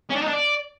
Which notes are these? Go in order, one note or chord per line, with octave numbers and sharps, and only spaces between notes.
C#4
D4
D#4
D4
D5